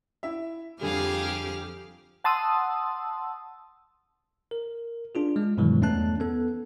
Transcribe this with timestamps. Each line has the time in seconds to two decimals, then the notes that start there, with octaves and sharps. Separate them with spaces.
0.23 E4 E5
0.81 F2 D3 G3 G4 G#4 F5 F6
2.24 F#5 A5 C6 D#6 E6
4.51 A#4
5.15 D4 F4 G#4
5.36 G#3
5.57 G2 B2 D#3 E3 F#3 G#3
5.82 E2 A3 C#4 D#4 A5 F#6
6.20 B3 A4